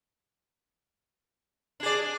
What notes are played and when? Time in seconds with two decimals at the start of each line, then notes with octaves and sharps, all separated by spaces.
1.80 D4
1.83 G#4
1.86 D5